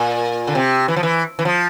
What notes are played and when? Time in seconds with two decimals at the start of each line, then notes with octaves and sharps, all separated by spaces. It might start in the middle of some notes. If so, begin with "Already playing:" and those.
Already playing: A#2
0.47 D3
0.55 C3
0.88 E3
0.96 F3
1.03 E3
1.39 E3
1.45 F3